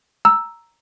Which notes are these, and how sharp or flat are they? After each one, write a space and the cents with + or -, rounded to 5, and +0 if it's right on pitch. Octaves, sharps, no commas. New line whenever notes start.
A#5 +0 E6 +0